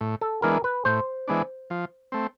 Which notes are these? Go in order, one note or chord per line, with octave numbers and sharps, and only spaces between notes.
A2
A4
E3 G#3 B3 D4 A#4
B4
A2 C5
E3 G#3 B3 D4
F3
A3 C4